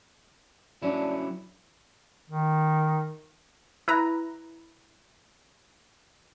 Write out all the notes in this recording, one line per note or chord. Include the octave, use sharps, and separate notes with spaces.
F#3 C#4 D4 E4
D#3
E4 B4 A#5